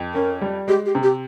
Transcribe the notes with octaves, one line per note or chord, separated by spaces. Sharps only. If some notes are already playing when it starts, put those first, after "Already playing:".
Already playing: F2
C#4 A#4
G3
G#3 G4
G4
C3
G4